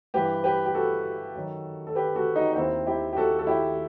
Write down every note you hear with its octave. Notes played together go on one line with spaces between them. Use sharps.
G2 E3 G4 B4
G4 B4
G4
F#4 A4
F#2 D#3
A4
G4 B4
F#4 A4
D#4 F#4
D#4
D#2 D#3 C4 E4
E4 G4
G4
F#4 A4
A4
E4 G4